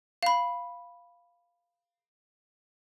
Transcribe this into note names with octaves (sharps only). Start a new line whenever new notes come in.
F5 B5